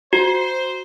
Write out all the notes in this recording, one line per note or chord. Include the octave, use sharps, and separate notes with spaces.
F#4 C5